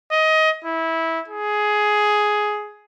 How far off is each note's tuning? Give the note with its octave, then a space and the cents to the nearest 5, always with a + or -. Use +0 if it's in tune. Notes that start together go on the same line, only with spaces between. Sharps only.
D#5 +20
E4 -15
G#4 +10